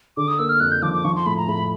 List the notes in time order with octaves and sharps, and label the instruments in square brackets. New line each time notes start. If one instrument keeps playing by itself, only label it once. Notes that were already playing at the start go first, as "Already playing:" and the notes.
[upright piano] D3 [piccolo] D6
[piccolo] D#6
[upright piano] A#3 [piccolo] E6
[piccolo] F6
[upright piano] F2 [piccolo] F#6
[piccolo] G6
[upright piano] F3 [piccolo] D6
[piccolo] D6
[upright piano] F3 [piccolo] C#6
[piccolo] C6
[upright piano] A2 [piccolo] B5
[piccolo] A#5
[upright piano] A2 [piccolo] B5